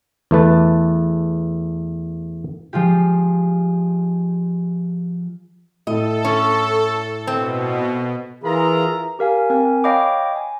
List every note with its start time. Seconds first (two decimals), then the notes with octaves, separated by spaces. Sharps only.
0.31 E2 A3 B4 A5
2.73 F3 G#3 F4 G4
5.87 A2 E4 A4 D#5
6.25 C#4
7.27 B2 C4
8.44 E3 F4 G#4 A#4 E5 A#5
9.19 G4 A#4 F5 G#5
9.50 C4 A#4 G#5
9.84 C#5 D#5 F5 G5 B5 D6
10.36 G#5